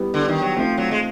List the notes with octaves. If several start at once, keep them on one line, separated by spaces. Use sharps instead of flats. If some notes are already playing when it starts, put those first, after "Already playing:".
Already playing: G3 B3 E4
D3
D#3
F#3
F3 A3 C4 F4
F#3
G#3